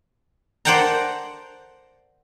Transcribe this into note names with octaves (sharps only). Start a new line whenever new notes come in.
C5 D5 F#5 G5 A5 A#5